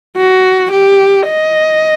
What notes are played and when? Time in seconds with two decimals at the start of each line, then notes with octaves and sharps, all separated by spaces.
0.17 F#4
0.72 G4
1.26 D#5